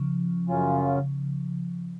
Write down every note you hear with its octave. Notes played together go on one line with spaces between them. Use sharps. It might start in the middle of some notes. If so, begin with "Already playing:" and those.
Already playing: C#3 F3
F#2 C#3 F#3 C#4 F4